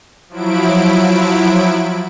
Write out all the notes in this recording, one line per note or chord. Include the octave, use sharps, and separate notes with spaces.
F3 F#3 E4 D7